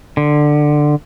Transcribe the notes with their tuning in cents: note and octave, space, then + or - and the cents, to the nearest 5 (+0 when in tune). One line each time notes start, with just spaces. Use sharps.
D3 +15